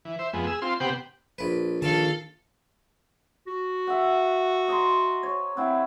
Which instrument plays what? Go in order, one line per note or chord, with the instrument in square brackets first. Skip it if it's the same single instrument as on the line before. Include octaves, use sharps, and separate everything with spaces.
[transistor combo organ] E3
C5 E5
F2 G#3 B3
G#4 E6
C4 F4 C6
C3 B3 G4 C5 F#5 G5
[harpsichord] A#1 B4
[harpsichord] A#1 A5 [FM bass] D#3 [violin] A4 F5
[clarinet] F#4
[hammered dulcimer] E5 F#5
D#5 A#5 C6
C#5
[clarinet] C4 [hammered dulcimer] E4 F#5